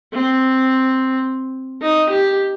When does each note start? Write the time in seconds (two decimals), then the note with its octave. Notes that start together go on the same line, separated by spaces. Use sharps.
0.13 C4
1.81 D#4
2.10 G4